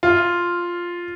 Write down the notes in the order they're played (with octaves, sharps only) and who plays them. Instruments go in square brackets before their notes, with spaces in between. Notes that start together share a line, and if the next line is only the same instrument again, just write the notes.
[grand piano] F4